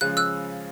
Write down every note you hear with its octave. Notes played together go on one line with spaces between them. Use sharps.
C#3 F3 G#3 C#4 F#6
E6 F#6